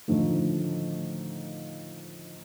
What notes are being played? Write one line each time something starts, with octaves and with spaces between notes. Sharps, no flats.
A2 D3 D#3 F3 A3